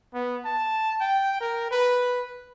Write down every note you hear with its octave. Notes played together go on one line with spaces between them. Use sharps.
B3
A5
G5
A#4
B4